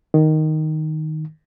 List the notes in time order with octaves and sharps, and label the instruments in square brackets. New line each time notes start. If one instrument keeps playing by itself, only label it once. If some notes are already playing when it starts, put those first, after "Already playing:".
[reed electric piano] D#3